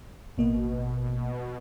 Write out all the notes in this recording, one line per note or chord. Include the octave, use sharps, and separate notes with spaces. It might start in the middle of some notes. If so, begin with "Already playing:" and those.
A1 B2 A#3 D#5